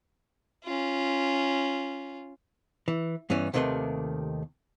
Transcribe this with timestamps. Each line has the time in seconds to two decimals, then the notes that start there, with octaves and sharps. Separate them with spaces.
0.64 C#4 F4
2.88 E3
3.30 G2 E3 B3 C#4
3.54 D#2 C3 D#3 A3 B4 C6